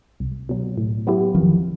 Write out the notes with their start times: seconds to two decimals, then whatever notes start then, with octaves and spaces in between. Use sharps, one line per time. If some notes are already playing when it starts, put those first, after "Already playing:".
0.20 C2
0.49 B2 F#3
0.77 A2
1.07 F#3 B3 E4 G4
1.35 F2 D#3 F3